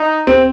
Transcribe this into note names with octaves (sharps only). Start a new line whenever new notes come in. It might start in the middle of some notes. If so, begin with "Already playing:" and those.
Already playing: D#4
C4